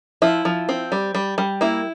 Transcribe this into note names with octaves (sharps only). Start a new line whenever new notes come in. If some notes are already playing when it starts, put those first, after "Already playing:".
F3 E4
F3
C4
G3
G3
G3
A#3 E4